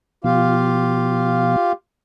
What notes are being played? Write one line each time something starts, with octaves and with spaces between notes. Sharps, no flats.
B2 F3 F4 G4 F5